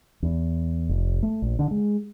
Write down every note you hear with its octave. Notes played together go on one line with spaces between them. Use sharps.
E2
F1
A3
A#1
D3
G#3